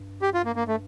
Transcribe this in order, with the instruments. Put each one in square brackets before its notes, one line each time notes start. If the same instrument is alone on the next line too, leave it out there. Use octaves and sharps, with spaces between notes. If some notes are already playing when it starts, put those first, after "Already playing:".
Already playing: [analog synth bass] G2
[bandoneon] G4
F4
A#3
A#3
A3